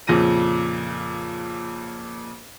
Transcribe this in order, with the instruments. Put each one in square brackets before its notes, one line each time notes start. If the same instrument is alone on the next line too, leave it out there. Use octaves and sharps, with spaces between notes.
[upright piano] F2 A#2 C#3 A#6 D#7